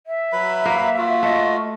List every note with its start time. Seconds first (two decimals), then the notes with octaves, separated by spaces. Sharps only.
0.07 E5
0.33 F#3 B4 B5
0.66 A#3
0.98 F4 F#4
1.23 A3 D#5